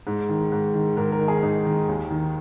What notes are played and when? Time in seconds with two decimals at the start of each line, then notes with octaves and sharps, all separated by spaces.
0.07 G#2
0.29 D#3
0.52 G#2
0.74 D#3
0.97 G#2 A#4
1.12 A#4
1.20 D#3
1.28 G#4
1.43 G#2 D#4
1.65 D#3
1.88 D#2
2.10 D#3